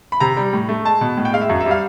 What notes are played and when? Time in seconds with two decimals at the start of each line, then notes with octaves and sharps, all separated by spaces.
0.12 B5
0.20 C3 A#5
0.37 G3
0.53 A2
0.69 A3
0.85 G#3 A5
1.01 B2
1.17 A2
1.25 G5
1.33 G#3 F5
1.41 E5
1.49 F#2
1.61 E5
1.66 G3
1.71 F5